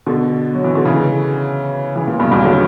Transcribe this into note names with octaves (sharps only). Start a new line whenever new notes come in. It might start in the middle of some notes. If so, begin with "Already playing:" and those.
B2 D3
F#3
E3
D3
C#3 E3
C#3 E3
A#2 C#3
G2 B2
E2 G2
D3 F#3